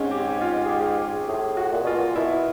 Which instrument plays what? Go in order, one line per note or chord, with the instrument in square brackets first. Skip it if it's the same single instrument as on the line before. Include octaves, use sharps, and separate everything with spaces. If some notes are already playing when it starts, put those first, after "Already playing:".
Already playing: [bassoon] G#2 [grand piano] C4 C#4
[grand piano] G4
F4
G#4
G4
G4
[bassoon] A2 [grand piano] G#4
[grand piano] F#4
[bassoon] A#2
[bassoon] B2 [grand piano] F4
[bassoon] A#2
[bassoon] B2 [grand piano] E4